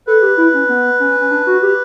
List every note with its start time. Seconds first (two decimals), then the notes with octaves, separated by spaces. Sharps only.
0.07 A4 B4
0.22 G4
0.37 E4
0.54 C#4
0.69 B3
1.00 C#4
1.20 C#4
1.31 D4
1.47 F#4
1.62 G4